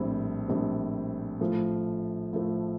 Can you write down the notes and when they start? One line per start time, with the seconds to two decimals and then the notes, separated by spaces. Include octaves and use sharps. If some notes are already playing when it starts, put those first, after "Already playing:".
Already playing: A#1 A2 G3 C4
0.48 A#1 A2 G3 C4
1.40 A2 F3 A3
2.33 A2 F3 A3